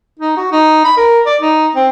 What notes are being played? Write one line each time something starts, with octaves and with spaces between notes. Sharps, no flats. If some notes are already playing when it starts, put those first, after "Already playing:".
D#4
F#4
D#4
B5
A#4
D5
D#4
C4